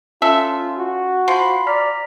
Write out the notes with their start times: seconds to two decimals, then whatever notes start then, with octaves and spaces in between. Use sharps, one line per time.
0.22 C#4 F4 A4 E5
0.78 F#4
1.28 F3 B5 C6
1.67 D5 A#5 F6 B6